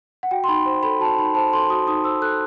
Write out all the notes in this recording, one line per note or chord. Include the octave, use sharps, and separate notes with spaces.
F#5
F#4 G5
C6
D#4 B5
C5
A4 B5
F#4 A5
D#4 B5
C5 A5
A4 C6
F#4 D#6
D#4 D#6
C5 E6
A4 F#6